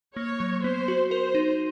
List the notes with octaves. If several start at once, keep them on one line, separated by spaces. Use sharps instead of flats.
A#3 C#5
F#3
B3 C5
F#4
A#4 C5
D#4